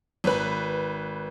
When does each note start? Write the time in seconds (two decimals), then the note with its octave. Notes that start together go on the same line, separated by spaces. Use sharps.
0.24 G#1 B4